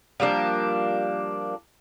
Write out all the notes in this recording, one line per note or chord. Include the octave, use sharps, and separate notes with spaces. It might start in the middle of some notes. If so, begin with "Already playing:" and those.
F3 G3 A#3 D4